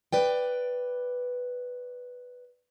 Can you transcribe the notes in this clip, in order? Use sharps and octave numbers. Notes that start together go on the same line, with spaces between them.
B4 D5 G5